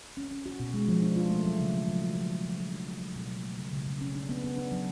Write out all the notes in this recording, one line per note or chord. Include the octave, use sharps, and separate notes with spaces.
C#4
C#4
F#4
B2
G#3
F3
D4
F4
A3
F#3
C#3
F#3
F3
F#4
F3
F#4
F3
D4
F3
F3
F#3
B2
F#3
A3
C#3
C#3
C#3
C#4
D4
B3
B3
D4
F#3